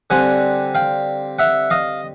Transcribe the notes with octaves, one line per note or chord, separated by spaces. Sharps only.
D3 G3 C4 F#5 G#5
F5 G5
E5 F#5
D#5 F5